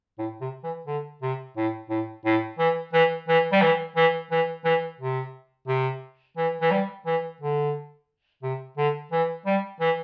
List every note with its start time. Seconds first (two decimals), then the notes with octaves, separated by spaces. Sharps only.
0.18 A2
0.41 C3
0.64 E3
0.87 D3
1.22 C3
1.57 A2
1.90 A2
2.25 A2
2.59 E3
2.93 E3
3.28 E3
3.52 G3
3.62 E3
3.96 E3
4.31 E3
4.65 E3
5.00 C3
5.68 C3
6.37 E3
6.61 E3
6.71 G3
7.06 E3
7.41 D3
8.43 C3
8.77 D3
9.12 E3
9.46 G3
9.80 E3